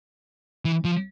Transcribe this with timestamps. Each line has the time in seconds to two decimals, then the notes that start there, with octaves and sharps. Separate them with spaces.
0.65 E3
0.85 F3